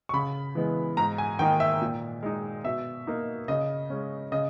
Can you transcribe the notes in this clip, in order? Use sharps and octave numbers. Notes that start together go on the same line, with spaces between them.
C#6
C#3 B5
E3 G#3 B3
G#2 A#5
G#5
D#3 A#3 D#4 G5
E5
A#2
G#3 D#4
B2 E5
A#3 D#4
C#3 D#5
G#3 C#4
C#3 D#5